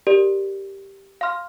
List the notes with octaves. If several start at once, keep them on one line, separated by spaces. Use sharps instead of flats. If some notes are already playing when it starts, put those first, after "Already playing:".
G4 A#4 D5
F5 C6 F6